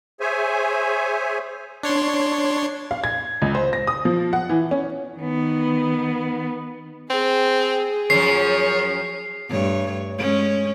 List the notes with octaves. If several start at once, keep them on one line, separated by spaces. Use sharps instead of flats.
G#4 C5 C#5 E5 G#5
D4 C#5 C6
F5
G#6
C#2
C5
A#6
D#6
F3
F#5
E3
C#4
D#3 B3
C4 G#4
F#2 C#3 F3 C#5 C7
G2 A3 C#5
G#3 C#4